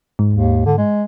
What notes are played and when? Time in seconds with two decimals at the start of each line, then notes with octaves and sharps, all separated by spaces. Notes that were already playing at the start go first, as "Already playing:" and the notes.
0.19 G#2
0.33 D#2
0.65 D3
0.77 G#3